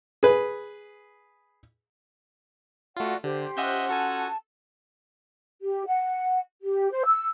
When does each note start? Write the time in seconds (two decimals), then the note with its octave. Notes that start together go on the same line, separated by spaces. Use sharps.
0.23 G#4 B4
2.97 A3 F4 F#4 D5 F#5
3.24 D3 G4 C5
3.57 C#4 F4 D#5 E5 F#5 G6
3.89 F#4 A4 G#5 A5
5.62 G4
5.87 F#5
6.63 G4
6.92 C5
7.05 E6